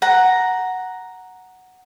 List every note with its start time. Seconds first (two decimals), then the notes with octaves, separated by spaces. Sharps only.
0.02 F#5 A#5